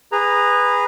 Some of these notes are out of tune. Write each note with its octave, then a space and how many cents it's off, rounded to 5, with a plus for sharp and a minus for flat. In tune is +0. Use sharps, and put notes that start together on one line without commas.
G#4 -20 B4 +0 A#5 +0